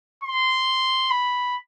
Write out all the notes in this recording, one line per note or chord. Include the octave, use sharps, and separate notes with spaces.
C6
B5